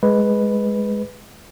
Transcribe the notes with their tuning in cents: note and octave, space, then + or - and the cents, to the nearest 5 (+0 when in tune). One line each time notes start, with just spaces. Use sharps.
G#3 +0 B4 +0